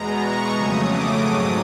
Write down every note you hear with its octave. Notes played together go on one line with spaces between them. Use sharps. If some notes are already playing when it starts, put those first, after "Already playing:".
Already playing: E2 B2 G#3 B3 A#5
C#6
F2 C#3 F#3 A3 D#6
D6
G#2 D#3 F#3 D#6